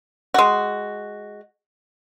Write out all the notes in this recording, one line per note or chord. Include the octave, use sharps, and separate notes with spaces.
G#3 F#4